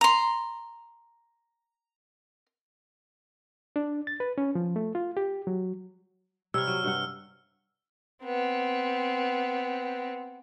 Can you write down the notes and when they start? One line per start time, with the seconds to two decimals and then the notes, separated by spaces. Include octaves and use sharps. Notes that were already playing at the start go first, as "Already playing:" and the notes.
0.01 A#5 C6
3.76 D4
4.07 A6
4.20 B4
4.38 C#4
4.55 F3
4.76 A3
4.95 F4
5.17 G4
5.47 F#3
6.54 C3 G3 C#5 E6 F6
6.67 F#3
6.84 G2 C3 F#5
8.24 B3 C4